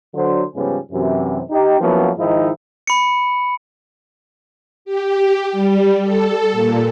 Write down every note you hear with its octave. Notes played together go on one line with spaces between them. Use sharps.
D3 F#3 C5
G#2 C#3 F3 G3 B3 C#4
F#2 C3 E3
D#4 G4
F3 F#3 A#3 B3 C#4 E4
G#2 D#3 F3 D#4 E4
B5 C#7
G4
G3
A4
A#2